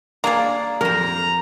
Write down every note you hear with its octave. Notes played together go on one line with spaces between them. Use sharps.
A#3 D4 G#4 D5
F2 A#4 C5 A#5